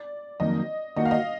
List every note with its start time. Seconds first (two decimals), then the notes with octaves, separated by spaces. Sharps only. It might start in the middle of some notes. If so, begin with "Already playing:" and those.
Already playing: D5
0.40 F2 D#3 F#3 A#3 D#5
0.96 D#3 A#3 D#4 F#4 D#5
1.05 F5
1.11 D#5